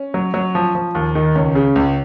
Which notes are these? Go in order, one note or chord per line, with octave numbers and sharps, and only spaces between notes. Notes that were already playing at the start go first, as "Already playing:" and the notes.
Already playing: C#4
F#3
F#3
F3
F3
D#2
D#3
C#2 C#4
C#3
C#2